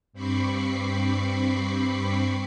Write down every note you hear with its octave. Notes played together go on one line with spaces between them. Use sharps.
G2 C4 B5 C#6 D6 C7